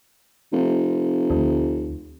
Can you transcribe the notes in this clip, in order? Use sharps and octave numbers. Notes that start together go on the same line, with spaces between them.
F1
D2